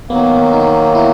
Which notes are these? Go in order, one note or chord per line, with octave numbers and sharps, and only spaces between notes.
D#3 F#3 A#3 B3
D#4
E4